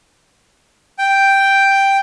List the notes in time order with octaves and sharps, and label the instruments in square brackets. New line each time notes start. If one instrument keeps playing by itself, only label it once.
[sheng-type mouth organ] G5